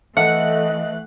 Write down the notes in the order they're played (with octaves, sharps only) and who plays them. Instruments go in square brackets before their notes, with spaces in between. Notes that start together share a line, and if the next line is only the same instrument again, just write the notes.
[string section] E3 A3 F#6 [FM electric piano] A4 E5 [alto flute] D#5 [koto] F#5